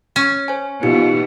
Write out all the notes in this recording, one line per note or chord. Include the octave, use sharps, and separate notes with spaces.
C#4
C5 G#5
B2 E3 D#4 F4 G4 C#7